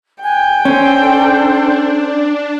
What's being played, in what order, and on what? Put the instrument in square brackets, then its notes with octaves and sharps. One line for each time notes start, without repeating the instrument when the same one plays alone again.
[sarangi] G5 [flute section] G#5 F#6
[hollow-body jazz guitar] C#4 [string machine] D4 [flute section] A4 C5 C6